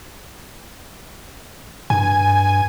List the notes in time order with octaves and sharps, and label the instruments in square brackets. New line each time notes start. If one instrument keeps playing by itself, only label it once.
[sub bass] G2 [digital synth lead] G#5